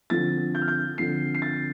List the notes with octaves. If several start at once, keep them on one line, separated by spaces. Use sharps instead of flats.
D3 F3 C4 A6
G6
F6
G6
D3 F3 C4 C7
C7
A6